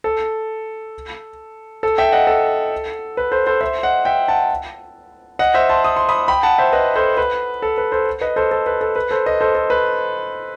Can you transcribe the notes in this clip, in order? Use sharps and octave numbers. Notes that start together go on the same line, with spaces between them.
A4
A4
E5 G5
D#5 F#5
A4
B4
A4 C5
A4 C5
C5 E5
D#5 F#5
E5 G5
F#5 A5
D#5 F#5
C5 E5
A5 C6
D#6
C6
B5 D#6
G5 B5
F#5 A5
C5 E5
B4 D#5
A4 C5
B4
A4
B4
A4 C5
B4 D#5
A4 C5
A4
B4
A4
B4
A4 C5
B4 D#5
A4 C5
A4
B4